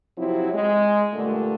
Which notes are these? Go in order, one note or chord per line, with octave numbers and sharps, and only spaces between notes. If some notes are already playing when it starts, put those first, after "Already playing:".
C3 F3 F#3 C4 E4
G#3
G2 A#2 D3 A3